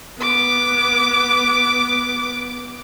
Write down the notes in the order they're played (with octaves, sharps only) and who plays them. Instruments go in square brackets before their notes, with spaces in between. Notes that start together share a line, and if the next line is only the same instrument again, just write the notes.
[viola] B3 D6